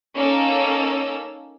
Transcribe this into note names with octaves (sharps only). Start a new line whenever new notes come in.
A#3 C#4 D#4 A4 E6